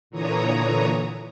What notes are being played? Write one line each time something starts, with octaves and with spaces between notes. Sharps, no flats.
A#2 D3 E3 C#5 A#5 D#6